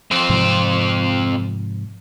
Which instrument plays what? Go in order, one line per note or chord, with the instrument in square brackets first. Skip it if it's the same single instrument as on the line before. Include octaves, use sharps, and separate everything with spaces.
[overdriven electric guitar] F2 C4
[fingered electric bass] G#2 C3 F3